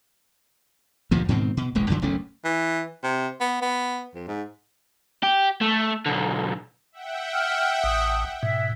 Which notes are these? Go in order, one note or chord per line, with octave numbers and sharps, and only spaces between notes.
D2 G2 A#2 F3
G#2 B2 D#3 C4
B2
E1 A1 G#3
F#2 D3 F#3
F#1 B1 A3 C#4
E3
C3
B3
B3
F2
G#2
G4
A3
B1 D3
E5 F#5 G5
F6
A1 D#6
G#2 B2 E5